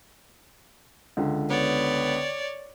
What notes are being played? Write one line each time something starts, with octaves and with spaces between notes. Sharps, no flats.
C#2 D3
B3 C#5 D5